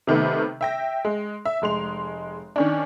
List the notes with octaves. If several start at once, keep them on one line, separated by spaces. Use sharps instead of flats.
C3 D#3 A3 B3
E5 G5 A#6
G#3
E5
F1 G#3 C6 F7
D#3 C#4 D4